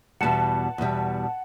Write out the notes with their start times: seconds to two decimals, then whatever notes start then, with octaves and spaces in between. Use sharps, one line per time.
0.21 E2 B2 G3 F#5 A5
0.78 E2 B2 G3